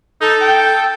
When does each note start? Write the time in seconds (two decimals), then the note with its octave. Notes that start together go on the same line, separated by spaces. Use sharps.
0.21 D#4 A4
0.41 G5